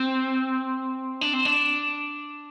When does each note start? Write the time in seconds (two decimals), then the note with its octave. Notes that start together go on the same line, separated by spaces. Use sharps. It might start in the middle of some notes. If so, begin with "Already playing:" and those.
Already playing: C4
1.21 D4
1.33 C4
1.45 D4